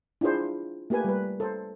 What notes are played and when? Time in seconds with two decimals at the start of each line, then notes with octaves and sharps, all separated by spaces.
0.21 D4 E4 F4 G#4 C5
0.90 A3 A#3 G4 B4 G#5
1.05 G3 B4
1.40 A4 C5